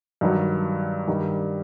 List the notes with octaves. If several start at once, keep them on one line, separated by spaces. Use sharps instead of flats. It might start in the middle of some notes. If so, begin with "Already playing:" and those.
G2 D#3 F#3
G2 D#3 G3